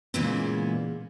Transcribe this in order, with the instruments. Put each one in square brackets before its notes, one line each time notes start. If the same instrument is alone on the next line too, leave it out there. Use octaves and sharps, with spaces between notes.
[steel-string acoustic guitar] A#2 C#3 E3 G#3 A#3 B3